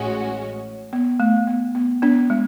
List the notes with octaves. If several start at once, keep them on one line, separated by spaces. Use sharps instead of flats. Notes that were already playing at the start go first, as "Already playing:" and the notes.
Already playing: A1 A2 G#3 C#4 F#4
B3
A3
B3
B3
B3 D4
G#3